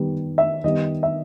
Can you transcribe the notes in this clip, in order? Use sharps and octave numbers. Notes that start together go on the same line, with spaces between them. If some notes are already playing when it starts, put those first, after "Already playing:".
Already playing: D#3 G3 B3
E5
D#3 G3 B3 D#5
E5